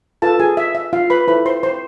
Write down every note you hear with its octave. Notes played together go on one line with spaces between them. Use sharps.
F4 A4 B4 A5
G#4 G#5
E5
E5
F4 F5
B4 B5
E4 A4 B4 C5 B5
C5 C6
C5 C6